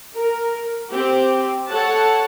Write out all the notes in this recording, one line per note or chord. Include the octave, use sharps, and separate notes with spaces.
A#4
C4 G4
A4 C#5 F#5 A5